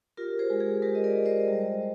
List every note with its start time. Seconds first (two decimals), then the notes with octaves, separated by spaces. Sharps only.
0.17 F4 G4 A#4
0.39 G#4 C5
0.50 G#3
0.60 G#4
0.82 G#3 G4 A#4
0.95 D#5
1.04 A#4 D5
1.15 G#3
1.26 C5 D#5
1.48 G3